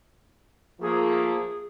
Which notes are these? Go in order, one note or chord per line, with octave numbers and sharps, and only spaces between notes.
F3 A3 A#3 G#4